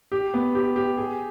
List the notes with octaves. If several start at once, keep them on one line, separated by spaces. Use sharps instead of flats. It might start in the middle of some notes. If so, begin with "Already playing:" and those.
G4
B3
G4
G4
G#4